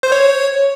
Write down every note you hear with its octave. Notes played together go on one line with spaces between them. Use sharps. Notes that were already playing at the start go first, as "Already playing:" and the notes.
C5
C#5